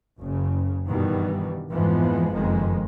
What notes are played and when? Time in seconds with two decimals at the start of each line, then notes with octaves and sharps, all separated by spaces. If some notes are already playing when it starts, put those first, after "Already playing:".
0.18 F#1 C#3
0.88 G2 B2 D#3 E3 G3
1.71 F2 G#2 E3 F3 G#3 B3
2.34 F#1 F2 D#3 G#3